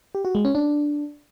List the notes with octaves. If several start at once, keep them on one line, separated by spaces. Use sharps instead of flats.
G4
F#4
G#3
C#4
D4